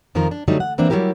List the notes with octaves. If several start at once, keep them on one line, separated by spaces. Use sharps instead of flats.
F2 D#3 F3 F4 A#4
D4
D3 F#3 G3 A3 D#4
F#5
E3 A#3 C4 D4
F#3 G3 E4 G4 A#4